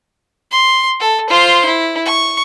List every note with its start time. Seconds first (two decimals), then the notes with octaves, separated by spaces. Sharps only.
0.51 C6
1.00 A4
1.30 F4 C5
1.65 E4
2.05 C#6